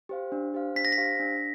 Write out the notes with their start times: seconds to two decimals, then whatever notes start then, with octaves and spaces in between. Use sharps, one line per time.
0.09 G4 C5 F5
0.32 D4
0.54 G4 C5 F5
0.75 D4 B6
0.85 A#6
0.92 B6
0.98 G4 C5 F5
1.20 D4